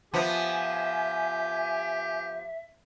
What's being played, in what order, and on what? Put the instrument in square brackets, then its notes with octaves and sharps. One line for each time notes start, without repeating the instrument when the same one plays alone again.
[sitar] F3 B3 [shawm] G4 [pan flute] E5 [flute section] G#5